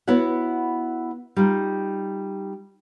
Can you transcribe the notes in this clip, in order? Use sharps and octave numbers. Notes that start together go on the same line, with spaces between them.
B3 E4 F#4 C#5 F#5
G3 D#4 F4